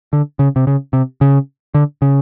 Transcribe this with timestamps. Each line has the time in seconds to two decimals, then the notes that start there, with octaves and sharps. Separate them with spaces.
0.13 D3
0.39 C#3
0.56 C3
0.67 C#3
0.93 C3
1.21 C#3
1.74 D3
2.02 C#3